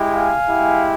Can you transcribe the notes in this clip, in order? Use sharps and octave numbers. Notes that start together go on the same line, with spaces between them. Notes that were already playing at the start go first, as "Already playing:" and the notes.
Already playing: G#3 E4 G4
F5 G#5
G#3 E4 G4